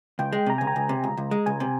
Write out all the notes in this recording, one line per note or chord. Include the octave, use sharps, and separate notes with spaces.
C#2 G5
G#3
C3 A#5
C#2 G#5
A#5
C#2
C3
C#2
C#2
G#3
C#2 G#5
C3